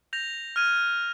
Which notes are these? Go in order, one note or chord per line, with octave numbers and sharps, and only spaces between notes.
G6 A#6 F7
F6 G#6 D#7